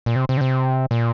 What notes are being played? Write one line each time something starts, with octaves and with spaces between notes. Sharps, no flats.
A#2
C3
C3
D3
C3
A#2